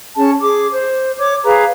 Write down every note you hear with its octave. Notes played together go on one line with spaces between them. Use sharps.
C#4 G#4 A5
G#4 D6
C5
C#5 D6
G#4 B4 F5 A#5